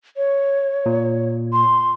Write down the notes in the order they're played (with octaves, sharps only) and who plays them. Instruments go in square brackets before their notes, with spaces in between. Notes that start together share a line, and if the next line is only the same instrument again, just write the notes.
[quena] C#5
[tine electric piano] A#2
[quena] C6